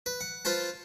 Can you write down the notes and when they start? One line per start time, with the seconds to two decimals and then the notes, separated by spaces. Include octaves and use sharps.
0.06 B4
0.21 F#5
0.45 F4 B4 C5 A5